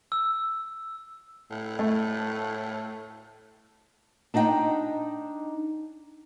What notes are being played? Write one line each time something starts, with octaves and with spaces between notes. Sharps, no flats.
E6
A2
A3
D4 D#4 D#5 F5 G5